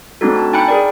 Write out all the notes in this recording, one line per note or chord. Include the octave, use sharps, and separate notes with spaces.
A3 C4 D4 D#4 F#4 A4
A5
D#4 G5 G#5 B5 F#6 C#7
G#4 A#4 D5